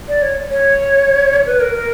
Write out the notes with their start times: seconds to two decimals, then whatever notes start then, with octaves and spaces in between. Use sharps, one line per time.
0.08 D5
0.22 C#5
0.50 C#5
1.46 B4
1.60 A#4
1.74 A#4